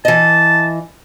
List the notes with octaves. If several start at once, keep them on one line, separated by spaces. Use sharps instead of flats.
E3 D#5 A5